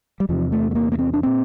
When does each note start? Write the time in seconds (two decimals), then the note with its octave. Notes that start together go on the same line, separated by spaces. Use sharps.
0.20 G3
0.29 E2 C3 F3
0.52 A3
0.71 A3
0.75 A#3
0.92 A#3
0.99 C4
1.14 D4
1.23 A#2 C4